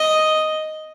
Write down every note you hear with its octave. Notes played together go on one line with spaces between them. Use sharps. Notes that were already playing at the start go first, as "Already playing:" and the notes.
Already playing: D#5